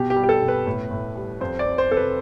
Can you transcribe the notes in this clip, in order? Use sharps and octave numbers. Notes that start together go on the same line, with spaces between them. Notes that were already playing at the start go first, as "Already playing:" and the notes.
Already playing: B2 G4
G4
G3
G4
A4
B2
B4
A2
A2
G3
F2 C5
D5
F2
C5
C3 A4
B4